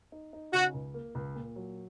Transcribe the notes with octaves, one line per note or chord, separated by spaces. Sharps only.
D#4
D#4
C#3 F#4
C#2
A#3
C#2
A#2
F#3